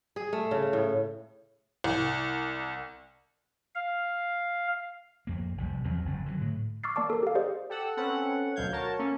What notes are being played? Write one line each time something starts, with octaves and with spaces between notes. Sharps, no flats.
G#4
A3
C#3
A2
C2
F5
F2 A#3
F1 C2 C3 G3
E2 F3 F#3 C4
F#1 G2 D3
D3 F#3
A2
C#6 D6 E6 F6 A6 C7
A#3 D5 A5 D6
A4 A#4
G4 F5
G4 G#4 C5 D5 D#5
G4 A4 F#5 E6
C4 C#4 A4 B4 F#5
D2 B2 F#3 F5 G6 G#6
F#4 A#4 C#5 A5
A#3 C#4 A4